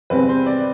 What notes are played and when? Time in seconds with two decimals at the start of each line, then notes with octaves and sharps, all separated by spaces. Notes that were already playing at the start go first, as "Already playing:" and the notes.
0.10 E2 C3 G3 C4 B4
0.29 C5
0.46 D5